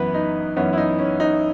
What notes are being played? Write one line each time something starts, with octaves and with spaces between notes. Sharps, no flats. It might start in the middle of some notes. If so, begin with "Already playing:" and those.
Already playing: F#2 E3 B3 B4
D#4
F#2 E3 B3 C#4
E4
D#4
C#4
D#4